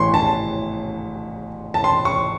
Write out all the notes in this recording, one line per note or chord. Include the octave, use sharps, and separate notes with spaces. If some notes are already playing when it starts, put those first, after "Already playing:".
Already playing: A1 A2 E3 C6 C#6
A5
A5
C6
C#6